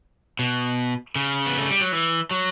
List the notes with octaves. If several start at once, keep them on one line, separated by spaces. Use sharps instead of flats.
B2
C#3
B3
A3
G3
F#3
E3
F#3